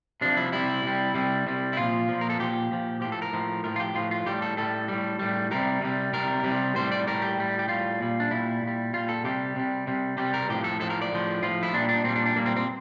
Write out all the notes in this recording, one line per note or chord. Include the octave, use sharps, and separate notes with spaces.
C3 F3 D4
E4
C3 G3 E4
C3 G3
C3 G3
C3 G3
E4
A#2 F3 F4
A#2 F3
A#4
A4
A#2 F3 G4
A#2 F3
A2 F3 G4
A4
A#4
A2 F3
A2 F3 A#4
F4
G4
A2 F3 F4
F4
A2 G3 G4
A4
A2 G3 A4
A2 G3
A2 G3
C3 G3 A#4
C3 G3
C3 G3 A#4
C3 G3
A2 G3 C5
D5
A2 G3 A#4
G4
A2 G3
G4
A2 G3 F4
A#2 G3
D4
A#2 G3 E4
A#2
G3
A#2 G3 F4
A4
C3 G3 G4
C3 G3
C3 G3
C3 G3 G4
A#4
A2 F3 G4
A4
A2 F3 A4
A#4
D5
A2 F3
A2 F3 F4
E4
A#2 G3 D4
D4
A#2 G3 C4
D4
D4
A#2 G3 A#3
C4
C4